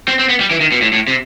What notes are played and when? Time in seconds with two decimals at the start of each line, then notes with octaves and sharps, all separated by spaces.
0.08 C4
0.19 C4
0.29 B3
0.40 G3
0.51 E3
0.61 D#3
0.72 B2
0.82 A2
0.93 A2
1.08 C3